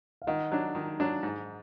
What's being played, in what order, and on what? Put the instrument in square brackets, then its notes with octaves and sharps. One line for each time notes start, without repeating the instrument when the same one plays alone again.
[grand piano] F5
[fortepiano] D#3 [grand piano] D#5 F#5
[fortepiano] F#3 D4
D#3
F#3 D4
G#2